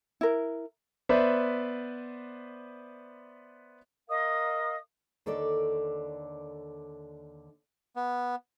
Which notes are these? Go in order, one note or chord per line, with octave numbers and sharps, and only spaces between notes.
E4 A#4
B3 B4 C5 D5 E5
A#4 D#5 F5 D#6
D#2 D3 A4 C#5 D5
B3